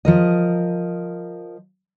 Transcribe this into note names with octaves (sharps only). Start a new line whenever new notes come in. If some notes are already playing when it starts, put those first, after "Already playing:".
F3 A#4 D#5